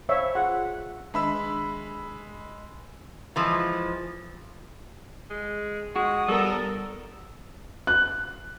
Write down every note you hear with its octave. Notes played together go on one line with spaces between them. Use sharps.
C5 C#5 E5 F5
F4 G#4 F#5
D#3 G#3 D4 E5 B5 E6
E3 F3 G#3
G#3
G#3 F#4 D#6
G3 B3 A4 A#4
F#6